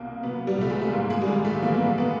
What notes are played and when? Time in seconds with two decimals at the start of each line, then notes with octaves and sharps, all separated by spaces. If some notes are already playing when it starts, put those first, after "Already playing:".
Already playing: C2 B2 A#3
0.23 F#3 B3
0.47 G3
0.58 C2 A3
0.70 G#3
0.82 A3
0.92 G#2 A#3
1.10 G#3
1.22 G3
1.27 G#1 G#3
1.45 A3
1.62 E3 A#3
1.74 B3
1.86 A#3
1.98 B3